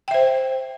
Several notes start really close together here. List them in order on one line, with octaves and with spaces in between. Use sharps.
G5 E5 C5